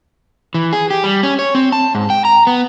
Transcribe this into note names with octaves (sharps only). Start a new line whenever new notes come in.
E3
G#4
G4
G3
C#4
C#5
C4
A5
G#2
G5
A#5
B3